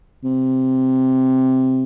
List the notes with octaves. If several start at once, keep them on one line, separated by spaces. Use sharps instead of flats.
C3